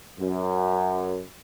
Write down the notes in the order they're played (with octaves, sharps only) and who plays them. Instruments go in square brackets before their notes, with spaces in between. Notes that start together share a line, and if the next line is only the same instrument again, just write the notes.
[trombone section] F#2